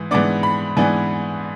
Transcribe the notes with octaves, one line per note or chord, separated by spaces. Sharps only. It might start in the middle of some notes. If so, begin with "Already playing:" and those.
Already playing: G#2 E3
G#2 E3 B3 D4 D6
B5
G#2 E3 B3 D4 G#5